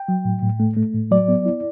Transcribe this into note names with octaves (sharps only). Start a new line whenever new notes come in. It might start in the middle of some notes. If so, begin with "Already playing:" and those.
Already playing: G5
F#3
A2
A2
A3
A3
A2
F#3 D5
B3
E4